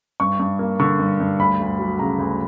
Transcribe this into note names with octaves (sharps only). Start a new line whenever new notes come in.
G2 C#6
G2
A#3
D3 C#6
G2
G2
D2 B5
D2
F#3
C#3 A#5
D2